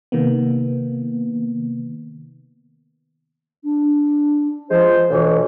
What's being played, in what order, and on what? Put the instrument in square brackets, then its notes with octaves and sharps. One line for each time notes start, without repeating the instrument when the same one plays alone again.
[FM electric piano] C3 D#3 A#3 B3
[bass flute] D4
[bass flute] F3 [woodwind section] G#3 F4 C5
[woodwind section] D2 B2 E3 [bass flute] C#5